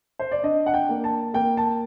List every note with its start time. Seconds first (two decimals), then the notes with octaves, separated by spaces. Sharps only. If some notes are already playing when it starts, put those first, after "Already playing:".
0.19 C5
0.32 D5
0.43 D4 D#5
0.66 F#5
0.74 G5
0.89 A#3
1.04 A5
1.34 A#3 G5
1.57 A5